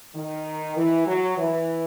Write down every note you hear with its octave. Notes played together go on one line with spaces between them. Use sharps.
D#3
E3
F#3
E3